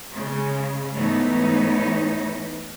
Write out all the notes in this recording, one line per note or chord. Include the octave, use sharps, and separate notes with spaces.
C#3 G#3
G#2 E3 A3 B3 D#4 C#5